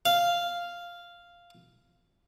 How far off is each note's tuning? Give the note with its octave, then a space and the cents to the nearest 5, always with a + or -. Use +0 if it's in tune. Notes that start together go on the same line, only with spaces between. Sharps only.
F5 -5